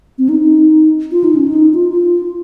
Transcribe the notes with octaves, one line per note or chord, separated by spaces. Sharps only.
C4
D#4
D#4
F4
D#4
C#4
D#4
F4
F4